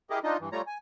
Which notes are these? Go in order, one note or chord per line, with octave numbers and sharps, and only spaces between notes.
E4 G4 G#4 A#4 D#5
D4 D#4 F4 D#5
G2 E3
G3 A3 F4 C#5 A#5
G#5